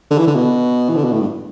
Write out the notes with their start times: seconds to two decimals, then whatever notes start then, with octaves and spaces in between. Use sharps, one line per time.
0.11 D3
0.18 E3
0.27 D3
0.36 B2
0.89 E3
0.96 D3
1.04 B2
1.12 A2
1.21 G2